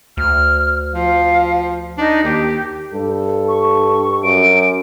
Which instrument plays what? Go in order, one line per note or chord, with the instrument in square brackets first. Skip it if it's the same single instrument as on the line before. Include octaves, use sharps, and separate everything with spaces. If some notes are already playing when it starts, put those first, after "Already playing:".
[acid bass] D2 [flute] F6
[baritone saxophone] F3 [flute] F5
[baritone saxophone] D4 [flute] D#4
[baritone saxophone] D#2 [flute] G4
[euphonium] G2 [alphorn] A4
[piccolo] C#6
[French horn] F#2 [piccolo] D7